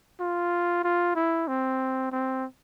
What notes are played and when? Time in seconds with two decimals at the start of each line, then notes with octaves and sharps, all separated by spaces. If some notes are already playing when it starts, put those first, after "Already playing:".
0.20 F4
0.84 F4
1.15 E4
1.48 C4
2.12 C4